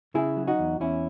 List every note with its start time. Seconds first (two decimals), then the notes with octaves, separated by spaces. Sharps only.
0.14 C#3 E4 G#4
0.37 F#3
0.47 D#4 F#4
0.59 E2
0.80 E2 C#4 E4